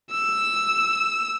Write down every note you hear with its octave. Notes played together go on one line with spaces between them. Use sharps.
E6